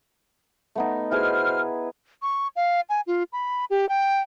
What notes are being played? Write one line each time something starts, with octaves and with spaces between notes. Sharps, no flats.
A3 B3 D#4
B2 E4 G#4 B4 C5 F6
C#6
F5
G#5
F4
B5
G4
G5